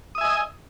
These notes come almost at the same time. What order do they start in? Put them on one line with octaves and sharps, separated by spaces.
D#6 E5 G#5 D#5